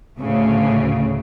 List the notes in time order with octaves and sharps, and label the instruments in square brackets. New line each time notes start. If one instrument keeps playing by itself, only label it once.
[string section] D2 A2 C#3